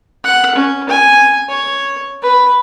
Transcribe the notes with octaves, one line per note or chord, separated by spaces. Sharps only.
F#5
C#4
G#5
C#5
B4